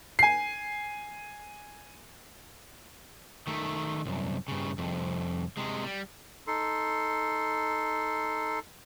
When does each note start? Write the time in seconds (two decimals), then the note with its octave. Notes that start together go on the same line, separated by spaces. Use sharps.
0.19 G#5 C7
3.47 D#3 A3
4.06 C2 F#2
4.48 G2 C#3
4.78 C2 F2
5.57 C3 G#3
5.84 G3
6.47 D#4 A4 C6